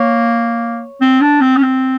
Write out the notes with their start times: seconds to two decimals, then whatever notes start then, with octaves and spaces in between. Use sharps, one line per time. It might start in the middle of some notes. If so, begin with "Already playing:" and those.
Already playing: A#3 C#5
1.01 C4
1.21 D4
1.41 C4
1.57 C#4
1.62 C4